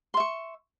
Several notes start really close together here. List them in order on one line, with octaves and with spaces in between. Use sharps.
C6 E5 C#6